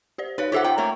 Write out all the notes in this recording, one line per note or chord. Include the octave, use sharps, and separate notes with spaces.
G4 C5 D5
D#4 B4 C#5 F5
F4 G4 A4 C5 E5 F#5
F4 F#5 G5 A#5
A3 A#3 C#5